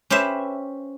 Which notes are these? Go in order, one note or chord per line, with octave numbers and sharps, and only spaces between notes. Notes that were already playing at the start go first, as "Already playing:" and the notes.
C#4 G4 B4 C5 E5